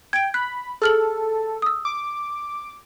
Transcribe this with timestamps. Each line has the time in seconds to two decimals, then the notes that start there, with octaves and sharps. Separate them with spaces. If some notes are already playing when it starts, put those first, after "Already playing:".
0.13 G5 G#6 D7
0.34 B5 F#6
0.82 G#4 A4 F6 F#7
1.62 D#6 E6
1.85 D6